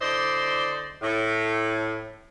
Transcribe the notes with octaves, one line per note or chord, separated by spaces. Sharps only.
D3 E4 C5 D5 D#5
A2